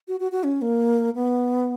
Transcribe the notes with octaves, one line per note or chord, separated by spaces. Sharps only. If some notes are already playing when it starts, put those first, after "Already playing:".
F#4
F#4
F#4
C#4
A#3
B3